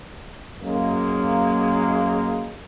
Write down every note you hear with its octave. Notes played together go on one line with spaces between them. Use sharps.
F#2 G#3 A#3